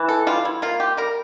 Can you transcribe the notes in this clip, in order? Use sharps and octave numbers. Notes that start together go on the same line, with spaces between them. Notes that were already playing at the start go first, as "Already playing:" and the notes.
Already playing: E3
A4
G3 F4
E4
A#3 F4
G4
G3 A#4